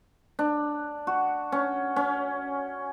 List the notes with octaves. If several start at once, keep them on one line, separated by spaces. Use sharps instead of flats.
D4
F#4
C#4
C#4